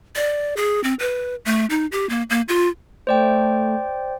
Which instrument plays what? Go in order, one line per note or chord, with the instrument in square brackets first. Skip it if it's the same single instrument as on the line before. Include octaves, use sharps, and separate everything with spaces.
[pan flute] D5
G#4
C4
B4
A3
D#4
G4
A#3
A#3
F4
[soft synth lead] A3 [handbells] C5 D5 G5